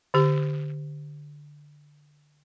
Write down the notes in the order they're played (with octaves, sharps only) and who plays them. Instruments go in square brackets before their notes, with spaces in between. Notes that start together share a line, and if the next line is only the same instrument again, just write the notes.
[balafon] D3 G4